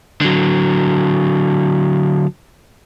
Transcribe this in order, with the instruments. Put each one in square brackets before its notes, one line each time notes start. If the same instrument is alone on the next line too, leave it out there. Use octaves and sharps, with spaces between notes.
[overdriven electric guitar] D3 F#3